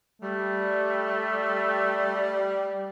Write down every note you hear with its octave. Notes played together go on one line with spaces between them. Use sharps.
G3 A3